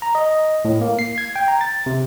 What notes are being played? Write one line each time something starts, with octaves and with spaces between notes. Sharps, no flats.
A#5
D#5
A2
A#3
C7
G#6
G5
A#5
A6
C3